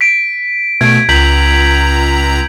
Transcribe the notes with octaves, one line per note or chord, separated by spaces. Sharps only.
B6 D7
B2 A3 G#6 D7
C#2 A#5 G6 B6 F#7